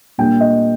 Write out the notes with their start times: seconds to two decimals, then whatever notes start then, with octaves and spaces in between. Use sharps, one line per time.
0.18 A#2 G3 A#3 D4 G5
0.41 D#5